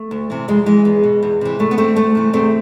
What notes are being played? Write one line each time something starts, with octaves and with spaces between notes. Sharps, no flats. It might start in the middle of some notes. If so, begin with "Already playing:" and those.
Already playing: A3
D2
C3 E3
F2 G#3
E3 G#3
E2
B2
E2
C3 E3
D2 A3
B3
D3 A3 C4
D2 A3
C3 E3
E2 A3 C4